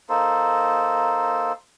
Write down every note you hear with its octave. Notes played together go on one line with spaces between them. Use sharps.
A#3 D#4 A4 C5